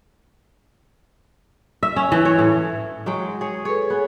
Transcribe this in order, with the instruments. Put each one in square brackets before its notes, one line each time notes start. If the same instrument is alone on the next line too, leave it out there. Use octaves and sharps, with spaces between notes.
[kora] E5
C#4
E3
C#5
A2
F#3 G#3 G5
G#4 C#5
[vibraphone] G#4 A4 B4 [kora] C#5
[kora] B3 [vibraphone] G#4 C#5 G#5